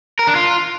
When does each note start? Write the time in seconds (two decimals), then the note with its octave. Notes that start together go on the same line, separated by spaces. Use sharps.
0.19 A#4
0.27 D4
0.36 F4